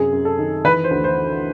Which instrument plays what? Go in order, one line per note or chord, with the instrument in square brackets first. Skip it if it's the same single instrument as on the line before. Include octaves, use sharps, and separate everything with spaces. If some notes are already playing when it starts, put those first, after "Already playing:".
Already playing: [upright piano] F#2 C3 G#4
F#2
A4
D#3
E3 B4
C5
D2
C5